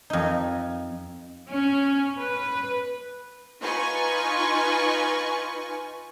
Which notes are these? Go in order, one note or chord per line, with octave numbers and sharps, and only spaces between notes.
F2 D#4
C#4
B4
D#4 F4 B4 G#5 C#6